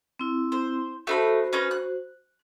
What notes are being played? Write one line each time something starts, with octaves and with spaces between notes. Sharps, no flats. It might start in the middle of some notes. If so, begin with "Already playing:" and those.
C4 E4
C5
A3 D#4 F#4 C5 B5
C#4 D#4 B4
F#6